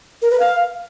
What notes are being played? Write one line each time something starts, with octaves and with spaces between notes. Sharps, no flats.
A#4
B4
F5